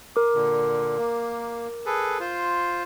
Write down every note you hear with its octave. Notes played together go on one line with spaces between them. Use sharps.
A#4 D6
A#2 D3
A#3
G#4 A4 B4
F4 C5